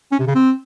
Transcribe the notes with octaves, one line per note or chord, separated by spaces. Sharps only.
C#4
C3
C#3
C4